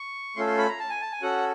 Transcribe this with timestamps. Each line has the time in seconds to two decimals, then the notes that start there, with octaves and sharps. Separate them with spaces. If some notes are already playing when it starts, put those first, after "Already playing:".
Already playing: C#6
0.36 A3 C#4 F4 A4 C6
0.47 C6
0.58 B5
0.68 A#5
0.79 A5
0.90 G#5
1.01 A5
1.12 G#5
1.22 C#4 F#4 A4 F#5